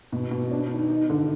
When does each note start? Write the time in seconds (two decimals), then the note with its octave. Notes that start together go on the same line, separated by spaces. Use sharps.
0.12 B2
0.31 B2
0.51 D4
0.71 D#3
0.89 D#4
1.10 D3